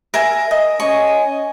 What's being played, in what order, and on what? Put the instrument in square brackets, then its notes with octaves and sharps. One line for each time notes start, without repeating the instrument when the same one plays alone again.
[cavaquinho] A#4 E5 G#5
D#5
[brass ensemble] C#4 D#5 G#5 [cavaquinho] C#6